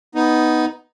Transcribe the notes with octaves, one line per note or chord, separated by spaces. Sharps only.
B3 D#4